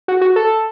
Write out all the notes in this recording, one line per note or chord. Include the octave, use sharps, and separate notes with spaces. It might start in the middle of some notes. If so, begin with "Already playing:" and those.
F#4
F#4
A4